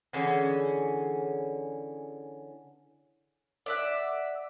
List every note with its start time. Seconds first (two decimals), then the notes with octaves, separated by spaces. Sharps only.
0.13 D3 E3 C#4 G#4
3.66 D5 E5 F#5